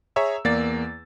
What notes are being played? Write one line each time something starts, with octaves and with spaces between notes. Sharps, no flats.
G#4 C#5 E5 A#5 E6
E2 A#3 D5 A6